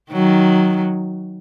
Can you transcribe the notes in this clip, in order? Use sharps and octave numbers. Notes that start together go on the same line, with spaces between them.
D#3 F#3